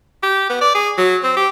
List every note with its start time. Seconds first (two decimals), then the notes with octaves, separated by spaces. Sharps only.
0.23 G4
0.50 B3
0.61 D5
0.75 G#4
0.98 F#3
1.23 C4
1.37 G4